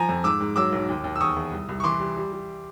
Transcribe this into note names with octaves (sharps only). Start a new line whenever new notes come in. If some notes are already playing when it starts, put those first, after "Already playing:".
Already playing: F3 G#5 A#5
F2
G#2 D6 E6
G#2
F#3 D6 E6
B1
D#2
D#2
E6
E2 C#6 D#6
E2
C2
C2
C#6
E3 C6 D6
G3
G3
G3